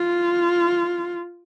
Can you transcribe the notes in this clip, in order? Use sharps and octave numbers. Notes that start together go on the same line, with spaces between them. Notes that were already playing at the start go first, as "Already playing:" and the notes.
Already playing: F4